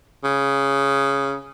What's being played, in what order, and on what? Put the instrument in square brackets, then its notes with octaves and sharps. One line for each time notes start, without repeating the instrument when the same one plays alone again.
[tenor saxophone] C#3